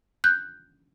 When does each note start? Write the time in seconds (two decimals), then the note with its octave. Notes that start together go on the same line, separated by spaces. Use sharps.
0.24 F#6 G6